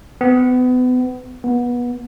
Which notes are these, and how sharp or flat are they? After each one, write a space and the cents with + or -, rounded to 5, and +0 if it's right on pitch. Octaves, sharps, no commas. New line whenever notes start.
B3 +30
B3 -25